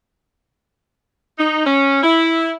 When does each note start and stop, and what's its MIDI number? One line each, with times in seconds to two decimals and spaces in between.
1.38 1.63 63
1.65 2.00 61
2.02 2.51 64